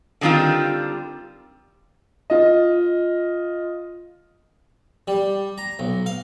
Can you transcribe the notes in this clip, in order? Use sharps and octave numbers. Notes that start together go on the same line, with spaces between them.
D3 D#3 G3 C4 F4 G4
F4 D#5
G3
A#5
B1
F5